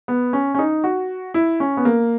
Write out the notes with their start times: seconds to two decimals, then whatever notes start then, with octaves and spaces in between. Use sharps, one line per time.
0.08 B3
0.33 C#4
0.55 C#4
0.59 D#4
0.84 F#4
1.34 E4
1.60 C#4
1.77 B3
1.85 A#3